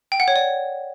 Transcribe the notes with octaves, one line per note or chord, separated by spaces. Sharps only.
G5
F#5
C#5
D5